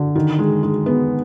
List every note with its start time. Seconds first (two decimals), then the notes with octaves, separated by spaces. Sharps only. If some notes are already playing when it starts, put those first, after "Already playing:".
Already playing: D3
0.15 D#3
0.39 G#3
0.63 G#3
0.86 B3